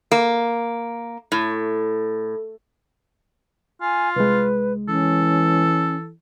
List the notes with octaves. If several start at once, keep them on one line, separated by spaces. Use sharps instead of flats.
A#3
A2
F4 G#5
C2 G#3 B4
E3 C#4 A4